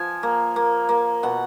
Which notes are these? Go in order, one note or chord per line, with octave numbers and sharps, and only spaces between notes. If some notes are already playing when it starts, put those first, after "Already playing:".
Already playing: F3 G#5
A#3
A#3
A#3
B2 F#5